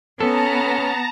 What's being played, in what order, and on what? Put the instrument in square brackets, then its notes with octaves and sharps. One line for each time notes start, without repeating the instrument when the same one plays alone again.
[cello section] B3 [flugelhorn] C#4 [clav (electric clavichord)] A4 [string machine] A5 A#5